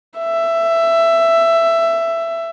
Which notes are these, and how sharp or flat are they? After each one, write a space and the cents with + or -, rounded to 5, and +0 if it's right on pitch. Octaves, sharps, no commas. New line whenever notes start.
E5 +15